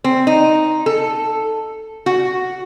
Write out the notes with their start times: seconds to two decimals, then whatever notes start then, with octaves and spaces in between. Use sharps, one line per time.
0.04 C4
0.27 D#4
0.86 A4
2.06 F#4